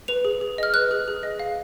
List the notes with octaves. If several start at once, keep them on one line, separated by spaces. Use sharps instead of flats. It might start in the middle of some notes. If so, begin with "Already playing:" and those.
B4 F7
G#4
G#4
D#5 F6
B4 F#6
G#4
G#4
D#5
F5